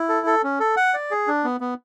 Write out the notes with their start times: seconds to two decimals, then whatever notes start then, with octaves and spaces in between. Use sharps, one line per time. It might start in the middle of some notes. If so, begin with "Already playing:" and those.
Already playing: E4
0.09 A4
0.26 A4
0.44 C#4
0.60 A4
0.77 F#5
0.94 D5
1.11 G#4
1.27 D4
1.44 B3
1.60 B3